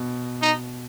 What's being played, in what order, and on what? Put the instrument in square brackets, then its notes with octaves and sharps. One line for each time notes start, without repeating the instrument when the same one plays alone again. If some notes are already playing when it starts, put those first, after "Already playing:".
Already playing: [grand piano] B2
[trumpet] D#4